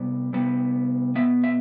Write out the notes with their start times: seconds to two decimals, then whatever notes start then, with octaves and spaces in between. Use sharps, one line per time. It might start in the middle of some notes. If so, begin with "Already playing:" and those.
Already playing: C3 G3 B3
0.33 C3 G3 B3
1.15 B2 B3 E5
1.44 E5